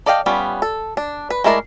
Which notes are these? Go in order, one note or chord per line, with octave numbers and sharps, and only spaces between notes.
A4 D5 D#5 F5 G5
G3 B3 C#4 F4
A4
D4
B4
G#3 A3 E4 A#4 D5